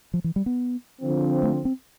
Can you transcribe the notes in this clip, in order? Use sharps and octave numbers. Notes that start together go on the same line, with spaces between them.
F3
E3
G3
B3
D3 F3 C4
A3
C4